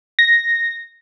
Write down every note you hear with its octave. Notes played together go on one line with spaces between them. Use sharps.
A#6